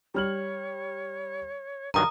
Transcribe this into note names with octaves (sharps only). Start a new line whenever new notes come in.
G3 C#5 F6 F#7
G2 D#3 F#3 A#4 A#5 D#6